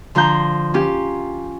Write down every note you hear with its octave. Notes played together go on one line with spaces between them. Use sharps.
D3 F3 F4 A#5 G6
C#4 F4 G4